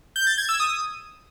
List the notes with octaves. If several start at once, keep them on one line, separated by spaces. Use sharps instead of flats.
G6
A6
G#6
E6
D#6